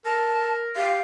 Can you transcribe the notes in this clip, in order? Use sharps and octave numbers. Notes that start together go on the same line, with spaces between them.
A#4 A5
G4 F5